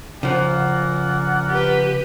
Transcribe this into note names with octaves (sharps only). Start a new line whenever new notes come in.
C#3 F3 A#4 D5 F#5
G4 B4